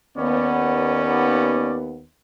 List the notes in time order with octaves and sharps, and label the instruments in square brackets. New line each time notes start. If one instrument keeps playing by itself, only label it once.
[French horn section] D#2 B3 [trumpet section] C#4 D5